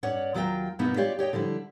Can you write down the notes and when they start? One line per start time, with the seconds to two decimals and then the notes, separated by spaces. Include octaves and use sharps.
0.03 G2 C#4 C#5 D5 F#5
0.34 D#2 F#3 F4 G#4 G5 A#5
0.79 G2 B2 E3 A#3 B3 D#4
0.97 F4 G4 C#5 D5 F5
1.19 G4 C#5 D#5 G5
1.33 D3 F3 G3 E4